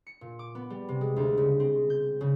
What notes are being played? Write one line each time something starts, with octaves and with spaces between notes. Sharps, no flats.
C#7
A#2
D6
B3
G3
C3
G#3
D2
C#3
C4
G6
C#3